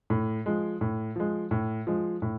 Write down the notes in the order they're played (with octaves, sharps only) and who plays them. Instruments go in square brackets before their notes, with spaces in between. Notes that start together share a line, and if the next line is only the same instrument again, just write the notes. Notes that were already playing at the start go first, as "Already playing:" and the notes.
[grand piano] A2
F3 G#3
A2
F3 G#3
A2
F3 G#3
A2